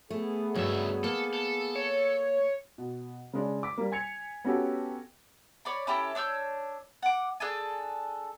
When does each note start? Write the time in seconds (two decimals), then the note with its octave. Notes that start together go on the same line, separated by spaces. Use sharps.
0.10 A3 B3 G#4
0.55 C#2 G2 F#3 E5
1.04 A#3 A4
1.33 A4
1.75 C#5
2.78 B2
3.33 C#3 G#3 D4
3.63 D6 B6
3.78 G3 A#3
3.92 G#5 G#6 C#7 F7
4.45 B3 C#4 F#4 G4 A4
5.65 C#5 D5 B5
5.87 C#4 E4 G4 A4
6.15 D4 C#5 E6 G6
7.02 F#5 D6
7.40 D4 G#4 A4 G#5